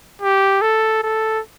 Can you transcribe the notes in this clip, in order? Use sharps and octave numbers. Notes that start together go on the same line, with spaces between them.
G4
A4
A4